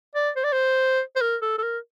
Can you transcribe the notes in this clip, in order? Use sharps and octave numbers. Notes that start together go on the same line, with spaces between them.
D5
C5
D5
C5
C5
A#4
A4
A4
A#4